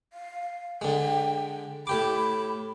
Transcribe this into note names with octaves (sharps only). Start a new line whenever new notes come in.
F5
D3 G#3 G5
A2 G4 B5 D6